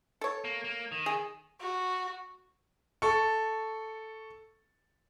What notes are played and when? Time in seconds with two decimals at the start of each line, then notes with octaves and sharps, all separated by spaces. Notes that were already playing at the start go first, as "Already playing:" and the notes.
0.21 A4 C#5
0.44 A#3
0.64 A#3
0.92 D#3
1.06 G#4
1.61 F#4
3.02 A4 C#6